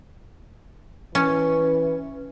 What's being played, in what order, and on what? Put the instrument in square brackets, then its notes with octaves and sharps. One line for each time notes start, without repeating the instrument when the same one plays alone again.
[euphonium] E3 [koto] C#4